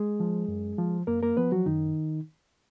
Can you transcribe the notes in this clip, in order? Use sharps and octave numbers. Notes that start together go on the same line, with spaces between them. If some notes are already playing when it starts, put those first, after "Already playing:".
Already playing: G#3 G#4
F3
F#2
F3
F#2 A#3 A#4
A#3 A#4
F3 B3 B4
F#3 F#4
F#2 D#3 D#4